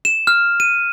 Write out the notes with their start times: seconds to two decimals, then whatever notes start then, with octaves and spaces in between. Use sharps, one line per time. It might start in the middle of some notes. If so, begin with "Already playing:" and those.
0.05 E7
0.27 F6
0.60 D#7